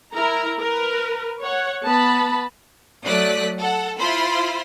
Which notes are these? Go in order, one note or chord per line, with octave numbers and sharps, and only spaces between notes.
E4 A#4 A#5
A#4 B4
C#5 F#5
B3 A5 B5
F#3 A3 D5 D#6 F#6 B6
A4 F#5
E4 F4 C5 B5 C6